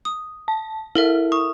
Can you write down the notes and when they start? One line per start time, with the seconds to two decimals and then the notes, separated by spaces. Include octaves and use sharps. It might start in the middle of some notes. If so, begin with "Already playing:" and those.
0.05 D#6
0.48 A5
0.95 E4 A4 A#4 E5
1.32 C#6 D#6